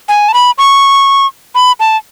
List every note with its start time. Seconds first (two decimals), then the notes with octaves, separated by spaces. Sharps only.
0.09 G#5
0.29 A5
0.34 B5
0.58 C#6
1.55 B5
1.80 A5